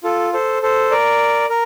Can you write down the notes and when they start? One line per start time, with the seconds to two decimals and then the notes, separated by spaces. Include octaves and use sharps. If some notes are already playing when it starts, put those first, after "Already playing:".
0.03 F4 A4
0.33 A4 C5
0.62 A4 C5
0.91 A#4 D5
1.49 A#4